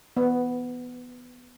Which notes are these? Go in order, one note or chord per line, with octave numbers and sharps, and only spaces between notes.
B3